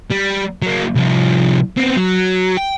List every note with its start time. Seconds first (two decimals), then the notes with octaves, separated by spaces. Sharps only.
0.10 G3
0.62 F#3 A#3
0.95 C2 F3
1.77 B3 C4
1.96 F#3
2.57 G5